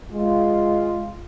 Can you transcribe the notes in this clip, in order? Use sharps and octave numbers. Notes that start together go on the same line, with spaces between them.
G#3 F4